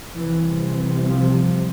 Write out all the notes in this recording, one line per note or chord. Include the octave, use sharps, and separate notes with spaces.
C2 C3 E3
E3
F3